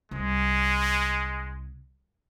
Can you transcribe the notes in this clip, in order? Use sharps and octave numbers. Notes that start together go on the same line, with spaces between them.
C2 G#3